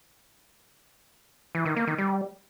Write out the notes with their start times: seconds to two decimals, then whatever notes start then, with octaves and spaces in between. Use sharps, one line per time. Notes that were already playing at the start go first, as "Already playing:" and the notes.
1.55 E3
1.66 D#3
1.76 A#3
1.87 D#3
1.98 G3